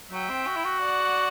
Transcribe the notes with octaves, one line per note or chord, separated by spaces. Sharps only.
F#3 E5 G5
C4
F#4
E4
F#4
D5 F#5